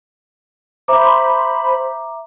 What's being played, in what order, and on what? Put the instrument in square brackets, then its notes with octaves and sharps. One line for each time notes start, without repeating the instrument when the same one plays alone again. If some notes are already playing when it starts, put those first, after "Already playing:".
[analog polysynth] C5 B5 [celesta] E5 A#5 D6